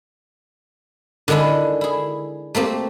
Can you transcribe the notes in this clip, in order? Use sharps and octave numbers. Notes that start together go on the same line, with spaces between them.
D3 D#3 G#3 D4 E4
E4 G#4
A3 A#3 C4 G4